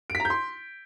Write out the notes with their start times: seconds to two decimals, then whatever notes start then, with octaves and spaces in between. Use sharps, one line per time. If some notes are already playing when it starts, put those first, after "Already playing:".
0.10 D7
0.15 B6
0.20 A#5
0.25 G6
0.30 C6